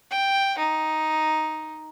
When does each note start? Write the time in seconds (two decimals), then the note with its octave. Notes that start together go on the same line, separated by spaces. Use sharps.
0.11 G5
0.58 D#4